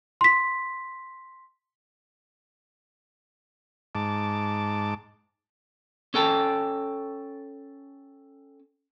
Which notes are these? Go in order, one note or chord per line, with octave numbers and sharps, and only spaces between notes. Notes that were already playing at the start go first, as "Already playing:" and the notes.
C6 B6
G#2 A5 D6
C#4 A4 G5 A5